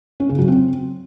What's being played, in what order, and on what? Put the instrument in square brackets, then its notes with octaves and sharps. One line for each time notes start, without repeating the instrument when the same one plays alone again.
[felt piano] C#4
C#3
F#3
C4